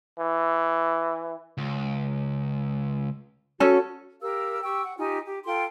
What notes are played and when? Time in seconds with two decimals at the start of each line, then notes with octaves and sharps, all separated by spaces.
0.19 E3
1.58 C#2
3.60 C#4 F#4 A4
4.22 G4 A#4 F5 E6
4.63 G4 G5 C#6 E6
4.83 F#5
4.98 D#4 F4 G4 G#5
5.26 G4
5.46 F4 A4 G5 C6